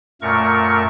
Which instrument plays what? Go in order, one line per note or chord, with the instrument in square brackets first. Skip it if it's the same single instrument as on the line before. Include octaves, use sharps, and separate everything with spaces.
[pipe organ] F#2 A#2 A3 A#4 C#6